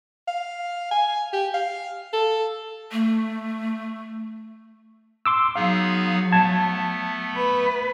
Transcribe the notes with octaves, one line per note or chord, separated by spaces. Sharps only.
F5
G#5
G4
F5
A4
A3
C6 D6 E6
F#3 B3 D#4 G#4 F5
A3 B3 A5 G#6
B4